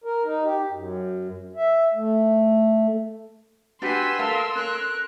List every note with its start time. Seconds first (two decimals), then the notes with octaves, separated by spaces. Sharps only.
0.04 A#4
0.25 D#4
0.44 G4
0.71 F#2
1.56 E5
1.94 A3
3.82 D4 F#4 G4 B4 F#5 G#5 C6 E6
4.19 A4 A#4 F5 A5
4.55 C#4 A#4 F#6